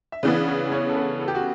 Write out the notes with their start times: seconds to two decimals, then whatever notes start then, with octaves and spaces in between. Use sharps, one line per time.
0.12 E5
0.23 C#3 E3 B3 D4 D5
0.48 C#4 C#5
0.72 C#4 C#5
0.89 A4
0.96 B3 B4
1.21 A4
1.28 G4
1.35 F#4